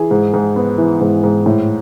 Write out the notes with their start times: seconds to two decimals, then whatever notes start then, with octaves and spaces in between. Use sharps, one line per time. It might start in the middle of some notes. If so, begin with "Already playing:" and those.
Already playing: E3 G#4
0.11 G#2
0.34 G#2
0.56 B3
0.78 E3
1.00 G#2
1.24 G#2
1.46 A2